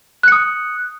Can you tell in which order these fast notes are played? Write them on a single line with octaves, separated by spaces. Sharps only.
F#6 C#7 D#6